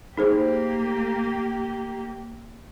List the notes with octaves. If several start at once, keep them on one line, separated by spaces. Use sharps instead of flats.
A#3 D#4 G4 G#4 C5